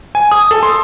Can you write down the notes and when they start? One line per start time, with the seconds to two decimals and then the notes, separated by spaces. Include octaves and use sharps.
0.15 G#5
0.31 D#6
0.51 A4
0.63 C6